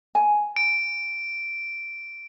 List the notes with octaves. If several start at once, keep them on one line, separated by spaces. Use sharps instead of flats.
G#5
D7